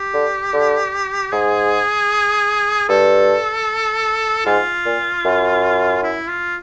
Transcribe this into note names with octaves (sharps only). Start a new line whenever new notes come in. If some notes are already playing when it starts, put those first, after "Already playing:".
Already playing: G4
D3
D3
G#2 G#4
G2 A4
G#2 F4
A#2
F#2
E4
F4